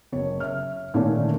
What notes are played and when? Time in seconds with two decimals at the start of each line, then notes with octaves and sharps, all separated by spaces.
0.12 F#1 C#5
0.40 E5 F6
0.94 A#2 D3 D#3 A3 C#4 D4